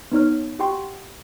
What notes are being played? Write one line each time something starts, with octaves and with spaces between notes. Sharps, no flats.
B3 D#4 C#5 F6
F#4 G4 F#5 G5 C6 C#6